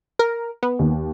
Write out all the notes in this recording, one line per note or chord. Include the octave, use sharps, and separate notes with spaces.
A#4
B3
D#2